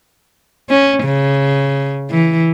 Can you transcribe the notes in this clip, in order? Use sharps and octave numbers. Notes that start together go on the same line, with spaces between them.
C#4
C#3
E3